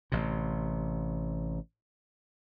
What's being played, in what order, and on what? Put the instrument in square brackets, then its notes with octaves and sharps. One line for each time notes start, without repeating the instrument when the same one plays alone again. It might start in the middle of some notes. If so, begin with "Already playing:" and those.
[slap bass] A1 C3